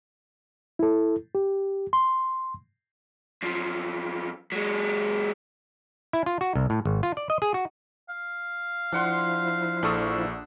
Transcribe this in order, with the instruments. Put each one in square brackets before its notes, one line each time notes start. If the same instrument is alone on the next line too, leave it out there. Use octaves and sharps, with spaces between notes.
[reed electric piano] E4 A4
G4
C6
[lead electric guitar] F#2 F3
F#3 G#3
[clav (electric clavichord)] E4
F4
F#4
C2
A2
G#1
F4
D5
D#5
G#4
F#4
[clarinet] F5
[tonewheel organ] F3 E4 [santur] D4 F#5 C6
[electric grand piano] A#1 A4 C#6 [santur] D4 D#6 E6